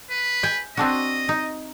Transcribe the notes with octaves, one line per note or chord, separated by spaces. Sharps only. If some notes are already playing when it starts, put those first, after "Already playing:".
B4
G5 G#5
C4 D4 F#4 D#5
D#4